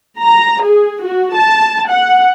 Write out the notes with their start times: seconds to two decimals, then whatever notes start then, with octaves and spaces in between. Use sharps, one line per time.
0.20 A#5
0.63 G#4
1.02 F#4
1.35 A5
1.89 F#5